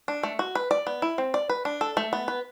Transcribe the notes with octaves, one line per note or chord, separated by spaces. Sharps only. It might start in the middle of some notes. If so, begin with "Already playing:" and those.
D4
A3
F#4
B4
D5
B3
E4
C4
D5
B4
D4
A4
A3
B3
B4